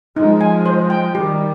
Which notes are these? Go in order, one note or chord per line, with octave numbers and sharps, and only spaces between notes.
F3 G#3 D#4
G#5
C5
G5
D#3 G3 G4